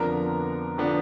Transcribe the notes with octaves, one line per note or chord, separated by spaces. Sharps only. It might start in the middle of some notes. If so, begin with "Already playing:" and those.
Already playing: F2 D3 F3 B3 D4 A#4 A#5
D3 F3 B3 D4